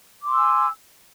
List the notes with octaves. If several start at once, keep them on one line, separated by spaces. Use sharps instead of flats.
G#5 C6 D6 E6